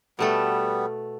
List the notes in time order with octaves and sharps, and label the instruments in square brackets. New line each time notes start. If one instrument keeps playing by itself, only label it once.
[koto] B2 A3 A4 [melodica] G3 B3